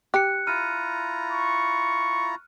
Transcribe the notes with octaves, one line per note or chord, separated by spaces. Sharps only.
G4 F#6 C#7
E4 F4 A#5 F6 D#7
C#6